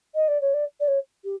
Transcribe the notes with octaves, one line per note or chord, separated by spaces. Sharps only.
D#5
D5
C#5
D5
D5
C#5
G4